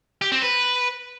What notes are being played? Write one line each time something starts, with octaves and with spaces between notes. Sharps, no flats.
G4
C4
B4